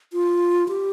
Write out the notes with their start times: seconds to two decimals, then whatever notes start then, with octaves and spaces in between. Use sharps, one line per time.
0.13 F4
0.69 G4